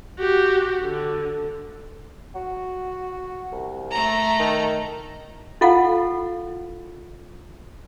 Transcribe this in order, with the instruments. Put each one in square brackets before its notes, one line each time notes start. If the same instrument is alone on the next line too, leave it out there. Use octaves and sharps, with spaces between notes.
[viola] F#4 G4
D3
[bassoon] F#4
C2
[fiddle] A3 A#5
[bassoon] D#3
[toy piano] E4 F4 A4 F5 F#5